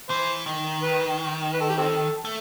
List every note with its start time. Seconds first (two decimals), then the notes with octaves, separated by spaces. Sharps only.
0.09 E3 C5
0.46 D#3
0.82 B4
1.54 B4
1.61 A4
1.69 G4
1.78 C4 A4
2.25 A3